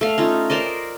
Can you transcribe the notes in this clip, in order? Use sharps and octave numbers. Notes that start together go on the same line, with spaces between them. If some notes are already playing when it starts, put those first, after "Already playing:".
A3 F5
C#4 D#4 F4
A#4 C5 D5 D#5